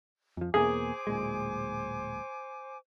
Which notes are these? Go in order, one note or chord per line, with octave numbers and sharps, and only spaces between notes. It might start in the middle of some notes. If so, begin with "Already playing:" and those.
F2 F3
E2 B2 A#3 G#4 C5 G#5 D6
D1 A#2 G#3